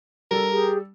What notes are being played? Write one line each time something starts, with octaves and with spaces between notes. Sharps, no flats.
G3 A4 A#4
G4 G#4